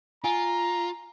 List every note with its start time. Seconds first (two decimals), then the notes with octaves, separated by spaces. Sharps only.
0.24 F4 G#5 A#5